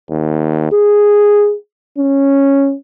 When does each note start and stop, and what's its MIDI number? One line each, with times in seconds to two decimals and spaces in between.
0.10 0.68 39
0.72 1.55 68
1.98 2.75 61